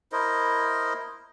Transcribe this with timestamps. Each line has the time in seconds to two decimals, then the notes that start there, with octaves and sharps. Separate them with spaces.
0.12 E4 A#4 C5 D#5